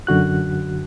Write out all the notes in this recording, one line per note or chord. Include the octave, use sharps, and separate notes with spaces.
F#2 D3 F#4 F#6